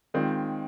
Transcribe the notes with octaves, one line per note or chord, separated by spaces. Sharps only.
D#3 G#3 C4 F4